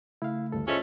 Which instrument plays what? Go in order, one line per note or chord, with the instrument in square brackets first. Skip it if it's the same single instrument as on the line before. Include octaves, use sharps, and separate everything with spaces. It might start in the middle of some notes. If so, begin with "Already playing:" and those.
[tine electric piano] C#3 A3 [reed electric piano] E4 F5
[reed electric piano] D2 G2 A4
[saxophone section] A3 C#4 [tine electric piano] F4 C5 D#5 [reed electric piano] G#4